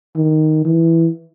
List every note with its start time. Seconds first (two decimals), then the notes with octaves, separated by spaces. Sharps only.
0.16 D#3
0.65 E3